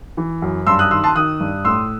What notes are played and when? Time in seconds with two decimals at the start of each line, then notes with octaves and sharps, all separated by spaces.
0.17 E3
0.42 F#2
0.67 G2 C6 E6
0.79 D#6 F#6
0.91 D#3 C6 E6
1.04 A5 C6
1.15 D#3 D#6 F#6
1.40 G2
1.65 A2 C6 E6